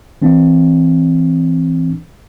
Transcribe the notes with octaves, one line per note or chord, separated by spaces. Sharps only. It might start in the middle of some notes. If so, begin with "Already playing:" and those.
E3 C4 D4